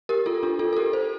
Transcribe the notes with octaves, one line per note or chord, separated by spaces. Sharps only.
G4 A#4
F4 A4
D4 F4
F4 A4
A4
G4 A#4
A4 C5